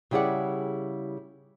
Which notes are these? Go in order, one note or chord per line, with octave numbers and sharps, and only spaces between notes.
C#3 G3 E4 G#4 D5 F#5